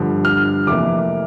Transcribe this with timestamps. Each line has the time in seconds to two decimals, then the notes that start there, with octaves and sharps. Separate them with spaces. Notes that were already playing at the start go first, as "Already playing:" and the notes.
Already playing: G1 G2 D3 F3
0.25 F6
0.67 F1 F2 E3 A#3 D6